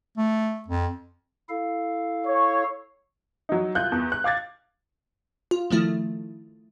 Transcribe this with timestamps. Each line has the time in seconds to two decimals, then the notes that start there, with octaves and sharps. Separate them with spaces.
0.17 A3
0.68 F2
1.49 E4 A4 F5
2.27 C#5
3.49 F#3 D#4
3.75 C2 F4 F#6 G6
3.92 E2
4.12 F#6
4.24 F5 D6 G#6 A6
5.51 F4
5.70 D#3 F3 A3 E4